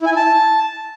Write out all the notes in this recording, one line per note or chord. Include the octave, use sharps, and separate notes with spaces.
E4
G#5
E4
A5